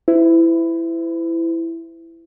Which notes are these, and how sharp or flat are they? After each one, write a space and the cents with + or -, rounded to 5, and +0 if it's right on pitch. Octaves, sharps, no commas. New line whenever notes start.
E4 +10 C5 -45